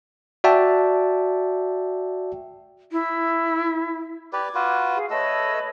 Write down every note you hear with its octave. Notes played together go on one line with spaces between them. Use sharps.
F#4 D5 E5 G5 A5
E4
G4 B4 D5 D6 G#6
F4 F#4 B4
G#4 F5
A3 A4 B4 C#5 D#5 E6